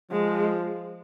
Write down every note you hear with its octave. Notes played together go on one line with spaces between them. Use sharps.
F3 G#3